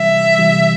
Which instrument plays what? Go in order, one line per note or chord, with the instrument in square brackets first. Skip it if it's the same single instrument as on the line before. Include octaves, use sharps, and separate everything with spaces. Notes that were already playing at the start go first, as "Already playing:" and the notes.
Already playing: [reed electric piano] C3 E3 G3 [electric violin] E5
[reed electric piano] C3 E3 G3